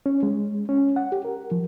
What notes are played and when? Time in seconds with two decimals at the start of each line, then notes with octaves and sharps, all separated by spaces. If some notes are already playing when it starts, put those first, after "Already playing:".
0.06 C#4
0.23 G#3
0.69 C#4
0.96 F#5
1.12 G4
1.25 A#4
1.51 F3